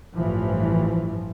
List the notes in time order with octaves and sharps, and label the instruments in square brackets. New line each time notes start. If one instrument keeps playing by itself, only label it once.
[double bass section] A1 G2 E3 F3